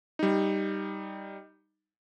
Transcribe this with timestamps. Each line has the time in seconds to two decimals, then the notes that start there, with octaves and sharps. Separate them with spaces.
0.19 G3 D#4